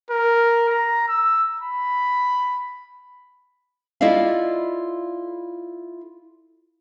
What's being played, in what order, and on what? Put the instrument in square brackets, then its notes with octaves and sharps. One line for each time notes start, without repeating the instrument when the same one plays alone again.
[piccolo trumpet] A#4
A#5
E6
B5
[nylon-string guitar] E4 F4 A4 D5 D#5 F5